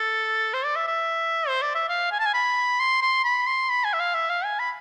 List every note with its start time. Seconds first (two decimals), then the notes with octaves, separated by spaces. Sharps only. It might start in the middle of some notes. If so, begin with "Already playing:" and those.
Already playing: A4
0.54 C5
0.65 D5
0.76 E5
0.87 E5
1.48 C5
1.62 D5
1.75 E5
1.89 F5
2.11 G#5
2.19 A5
2.26 G#5
2.34 B5
2.79 C6
3.02 C6
3.24 B5
3.46 C6
3.69 B5
3.85 G#5
3.94 E5
4.00 F5
4.14 E5
4.30 F5
4.44 G#5
4.59 B5